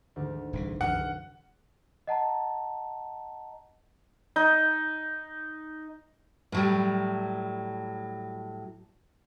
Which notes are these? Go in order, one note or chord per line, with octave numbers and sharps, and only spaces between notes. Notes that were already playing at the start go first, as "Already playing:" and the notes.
D2 G#2 D#3
D1 C2 E3
E1 C2 F#2 C3 F#5 F6
D#5 F#5 A5 A#5
D#4
A2 F#3 G3